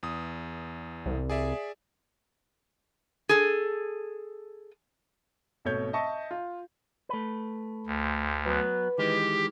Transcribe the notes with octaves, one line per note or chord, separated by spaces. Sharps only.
E2 D#6
C2
G#4 D5 E5
G#4 A4
G#1 B2 A3 C#5 G6
D#5 E5 A5 C#6
F4
A3 B4
D2
F#3 B3 B4
D#3 E3 G#3 G4